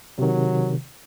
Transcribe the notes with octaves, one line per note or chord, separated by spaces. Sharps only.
C3 D#3 F#3